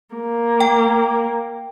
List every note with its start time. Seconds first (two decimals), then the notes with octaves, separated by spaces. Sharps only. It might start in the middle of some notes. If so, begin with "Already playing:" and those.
0.16 A#3
0.60 G5